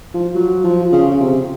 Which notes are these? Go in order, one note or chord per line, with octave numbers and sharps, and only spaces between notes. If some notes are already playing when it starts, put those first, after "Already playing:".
F3
F#3
F3
C#3
C#3
C3